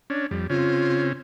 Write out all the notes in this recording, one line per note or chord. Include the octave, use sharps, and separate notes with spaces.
C#4 D4
F2 G3
C#3 C4 C#4 F4